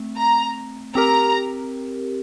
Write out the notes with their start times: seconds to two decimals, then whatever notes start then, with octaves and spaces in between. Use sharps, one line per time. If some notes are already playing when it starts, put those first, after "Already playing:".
Already playing: A3 C4
0.18 A#5
0.95 C4 G4 A#4 A#5